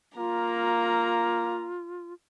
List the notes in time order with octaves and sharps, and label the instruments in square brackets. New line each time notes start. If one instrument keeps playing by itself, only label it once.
[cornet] A#3 [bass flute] F4 [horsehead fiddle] A#5